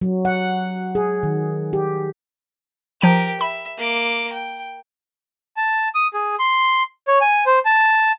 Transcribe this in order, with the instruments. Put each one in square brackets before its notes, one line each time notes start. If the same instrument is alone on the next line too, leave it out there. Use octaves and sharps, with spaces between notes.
[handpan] F#3
F#5
G#4
D#3
G4
[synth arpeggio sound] F3 A#5 D#7 [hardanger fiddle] G4 A#4
[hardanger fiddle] E5 [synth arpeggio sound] B5
[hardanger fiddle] A#3 D6
G5
[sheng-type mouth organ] A5
D#6
G#4
C6
C#5
G#5
C5
A5